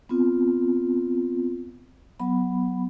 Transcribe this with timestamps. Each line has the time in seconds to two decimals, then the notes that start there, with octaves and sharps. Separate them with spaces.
0.09 B3 C4 F4
2.20 F#3 B3 B5